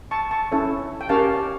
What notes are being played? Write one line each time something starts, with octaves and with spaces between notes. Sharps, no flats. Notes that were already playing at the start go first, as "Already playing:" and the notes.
A5 C#6
A5 C#6
C#4 E4 A4 C#5
G5
C#4 G4 A#4 C#5 F5 A5